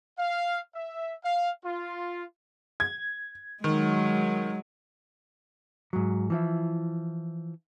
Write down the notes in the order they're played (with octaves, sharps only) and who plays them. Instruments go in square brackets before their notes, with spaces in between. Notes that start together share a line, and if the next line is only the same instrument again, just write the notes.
[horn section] F5
E5
F5
F4
[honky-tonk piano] G#6
[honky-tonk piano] D#3 [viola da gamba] F#3 G#3
[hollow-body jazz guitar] G#2 F#3
E3 F3 E4